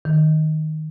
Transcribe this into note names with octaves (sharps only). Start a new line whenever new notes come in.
D#3